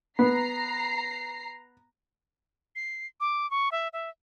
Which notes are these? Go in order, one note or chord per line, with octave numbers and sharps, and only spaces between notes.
B3 A#5 C7
C7
D6
C#6
E5
E5